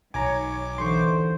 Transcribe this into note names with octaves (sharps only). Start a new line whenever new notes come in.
B1 D#3 C#5 G#5 A#5 D6
D#2 D3 E3 C5 C6 C#6